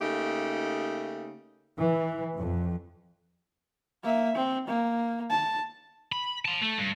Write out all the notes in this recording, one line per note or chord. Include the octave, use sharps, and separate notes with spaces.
C#3 A3 A#3 D#4 G4
E3
F2
A#3 E5
C4
A#3
A5
B5
A5 C6
A3
G2